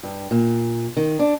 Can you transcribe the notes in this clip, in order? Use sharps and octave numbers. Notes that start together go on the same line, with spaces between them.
G2
A#2
D#3
D4